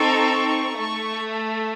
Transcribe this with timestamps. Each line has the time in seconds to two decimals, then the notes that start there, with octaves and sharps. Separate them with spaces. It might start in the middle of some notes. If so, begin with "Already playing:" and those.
Already playing: C4 D#4 A4 C#6
0.77 A3 C#6